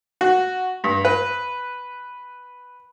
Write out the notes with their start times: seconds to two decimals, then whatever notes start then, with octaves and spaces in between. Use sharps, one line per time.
0.21 F#4
0.84 G2
1.05 B4